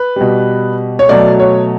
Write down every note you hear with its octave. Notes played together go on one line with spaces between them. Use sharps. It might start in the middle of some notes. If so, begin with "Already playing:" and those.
Already playing: B4
B2 G3
C#5
B2 F#3 A3 D5
C#5